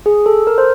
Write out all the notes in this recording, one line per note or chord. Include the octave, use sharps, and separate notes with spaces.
G#4
A4
A#4
C5